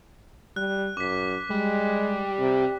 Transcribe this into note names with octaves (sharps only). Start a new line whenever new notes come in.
G3 F#6
F#2 D6 B6
G3 G#3
C3